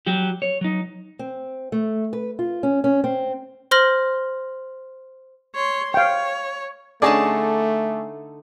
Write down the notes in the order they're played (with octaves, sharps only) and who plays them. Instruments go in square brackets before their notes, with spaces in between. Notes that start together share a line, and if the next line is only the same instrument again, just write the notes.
[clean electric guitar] F#3 F#4 G4
C#5
F#3 D#4
[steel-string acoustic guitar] C4
A3
B4
F4
C#4
C#4
C4
[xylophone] C5 C6 F6 A#6 F#7
[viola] C#5 C6
[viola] C#5 [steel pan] F5 G5
[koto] D3 D#4 A5 [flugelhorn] A3 [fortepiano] C#4 G#4 D5